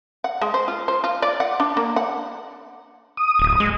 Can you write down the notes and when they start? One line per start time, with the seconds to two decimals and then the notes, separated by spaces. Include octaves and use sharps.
0.24 F#5
0.41 G#3
0.54 C5
0.68 F4
0.88 C5
1.04 F4
1.22 D5
1.40 F#5
1.60 D4
1.77 A#3
1.96 F#5
3.17 D#6
3.39 D1
3.60 G#3